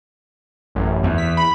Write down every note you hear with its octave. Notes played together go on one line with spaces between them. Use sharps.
A1 F#2
E2
B6
B5